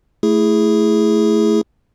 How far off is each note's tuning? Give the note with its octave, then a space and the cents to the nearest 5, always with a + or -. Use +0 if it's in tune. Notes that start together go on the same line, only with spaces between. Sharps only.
A3 +0 E4 +0 G#4 +0